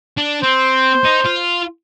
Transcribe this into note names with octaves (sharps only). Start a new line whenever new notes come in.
D4
C4 C5
D#4
F4